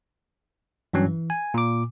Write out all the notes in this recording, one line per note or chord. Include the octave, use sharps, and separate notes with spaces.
G2 E3 F#3 C#4
E3
G#5
A#2 D6